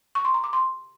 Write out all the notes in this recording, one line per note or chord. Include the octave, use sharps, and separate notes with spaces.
C#6
C6
A#5
D6
C6